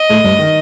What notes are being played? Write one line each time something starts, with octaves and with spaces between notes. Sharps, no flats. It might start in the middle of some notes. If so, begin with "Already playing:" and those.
Already playing: D#5
A2 A3
G2 G3
D#3